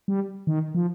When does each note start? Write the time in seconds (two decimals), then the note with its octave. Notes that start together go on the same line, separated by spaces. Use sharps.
0.08 G3
0.47 D#3
0.75 F3